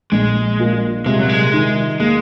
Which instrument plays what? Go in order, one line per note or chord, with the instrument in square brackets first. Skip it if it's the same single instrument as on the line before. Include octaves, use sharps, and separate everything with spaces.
[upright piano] A#1 [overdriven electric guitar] G#3
[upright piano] A#2
[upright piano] C3 [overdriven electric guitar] G#3
[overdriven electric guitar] F#3
G#3
[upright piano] D#3
[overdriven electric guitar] G#3 [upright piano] A#3